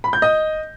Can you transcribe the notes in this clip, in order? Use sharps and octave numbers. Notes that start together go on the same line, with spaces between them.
B5
G6
D#5